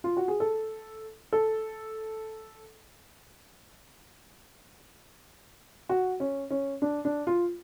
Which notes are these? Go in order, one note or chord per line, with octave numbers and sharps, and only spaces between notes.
F4
F#4
G#4
A4
A4
F#4
C#4
C#4
D4
D4
F4